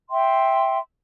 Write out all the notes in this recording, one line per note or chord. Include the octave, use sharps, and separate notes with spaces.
E5 G5 C6